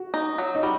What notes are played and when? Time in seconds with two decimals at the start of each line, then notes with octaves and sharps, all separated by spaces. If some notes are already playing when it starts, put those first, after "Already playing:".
Already playing: F#4
0.14 D#4
0.38 F#3
0.55 D#4
0.63 G3 F#4